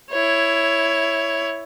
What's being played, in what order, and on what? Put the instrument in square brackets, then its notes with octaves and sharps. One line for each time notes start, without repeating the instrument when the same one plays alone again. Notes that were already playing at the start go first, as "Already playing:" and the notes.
[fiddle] E4 C#5